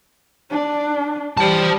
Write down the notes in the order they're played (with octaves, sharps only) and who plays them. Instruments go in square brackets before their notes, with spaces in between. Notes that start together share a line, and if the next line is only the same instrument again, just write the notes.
[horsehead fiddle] D4
[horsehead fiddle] G3 [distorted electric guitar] C5 A5